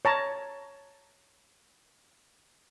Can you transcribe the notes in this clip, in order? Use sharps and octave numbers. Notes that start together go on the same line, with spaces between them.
C#5 A5 A#5